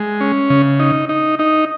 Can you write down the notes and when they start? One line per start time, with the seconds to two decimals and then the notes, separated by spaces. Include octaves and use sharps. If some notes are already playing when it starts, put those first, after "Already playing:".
Already playing: G#3
0.21 C#4
0.50 C#3
0.80 D#4
1.09 D#4
1.39 D#4